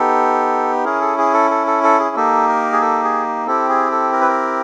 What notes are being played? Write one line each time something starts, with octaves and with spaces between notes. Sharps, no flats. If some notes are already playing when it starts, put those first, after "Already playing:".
Already playing: B3 D#4 G4 A4
C#4 E4 G#4 A#4
A4
G#4
A4
A4
A4
A4
G#4
A#3 D#4 G4 A4
A#4
G#4
A4
G#4
C4 E4 G4 A4
G#4
A4
A#4
B4
A#4